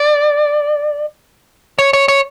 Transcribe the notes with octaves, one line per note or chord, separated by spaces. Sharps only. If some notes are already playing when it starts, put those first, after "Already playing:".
Already playing: D5
C#5
C#5
C#5